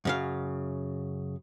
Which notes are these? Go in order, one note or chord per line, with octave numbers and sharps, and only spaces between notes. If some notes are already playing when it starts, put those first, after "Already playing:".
F#2 C#3 F5